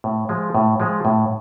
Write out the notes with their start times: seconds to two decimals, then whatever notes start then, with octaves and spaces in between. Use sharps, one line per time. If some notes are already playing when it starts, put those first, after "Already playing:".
0.04 A2
0.29 F3 G#3
0.55 A2
0.80 F3 G#3
1.05 A2